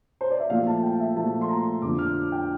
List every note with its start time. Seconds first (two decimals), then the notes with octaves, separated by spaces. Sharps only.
0.21 C5
0.31 D5
0.40 E5
0.49 A#2 F3 A3 F5
0.67 A5
0.83 G5
1.00 E5
1.16 A#2 F3 A3 A5
1.41 C6
1.49 A#5
1.82 F2 D3 F3 D6
1.99 F6
2.32 G5